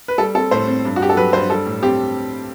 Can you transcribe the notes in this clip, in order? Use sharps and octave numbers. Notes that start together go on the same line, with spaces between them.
B4
G3 A4
C4 A4
A2 C5
C4
G2
F#4
G2 G4
A4
F#3 B4
G2 C5
G3 A4
A2
C4 G4